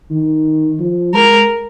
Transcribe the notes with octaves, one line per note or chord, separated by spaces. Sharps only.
D#3
F3
G#3 A#4